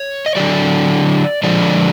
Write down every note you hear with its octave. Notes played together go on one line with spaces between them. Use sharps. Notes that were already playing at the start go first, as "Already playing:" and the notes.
Already playing: C#5
D#5
D3 F#3 D5
D3 F3 G#3 D5